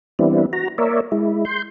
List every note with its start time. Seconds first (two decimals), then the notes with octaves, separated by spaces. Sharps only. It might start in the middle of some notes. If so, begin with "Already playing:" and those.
0.19 E3 G3 B3 C4 D4 E4
0.53 F#4 A#5
0.78 A#3 A#4 C#5 D5 E5
1.12 G#3 E4
1.45 C6 G6